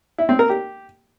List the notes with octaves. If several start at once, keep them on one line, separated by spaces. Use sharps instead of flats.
E4
C4
A#4
G4